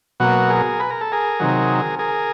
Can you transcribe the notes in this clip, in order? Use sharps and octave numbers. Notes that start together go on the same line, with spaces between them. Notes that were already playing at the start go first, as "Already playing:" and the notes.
B2 F#3 A#3 F#4
G#4 A#4
B4
A#4
A4
G#4 A#4
C3 D#3 F#3
G#4 A#4